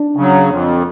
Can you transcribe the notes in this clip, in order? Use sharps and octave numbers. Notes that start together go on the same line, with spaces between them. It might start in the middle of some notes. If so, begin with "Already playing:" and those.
Already playing: D4
C#3 F#3
F2